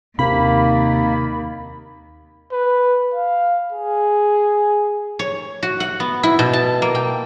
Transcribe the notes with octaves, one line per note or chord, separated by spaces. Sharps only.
D#2 C3 A#3 B5
B4
F5
G#4
C#5
F#4
F#5
B3
E4
B2
A5
A#3
G5